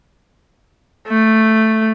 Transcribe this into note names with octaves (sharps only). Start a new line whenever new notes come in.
A3